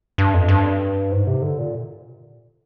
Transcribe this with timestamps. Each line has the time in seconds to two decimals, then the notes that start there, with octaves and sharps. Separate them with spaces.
0.18 G2
0.34 F2
0.48 G2
1.12 G#2
1.27 C3
1.42 D3
1.58 A#2